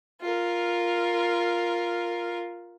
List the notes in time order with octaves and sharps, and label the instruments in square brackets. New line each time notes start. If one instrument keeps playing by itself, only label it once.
[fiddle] F4 A#4